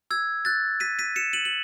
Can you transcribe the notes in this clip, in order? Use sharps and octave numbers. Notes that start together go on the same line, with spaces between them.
E6 G#6
F#6 A6
B6 D#7
B6 D#7
C#7 E7
D#7 F#7
F#7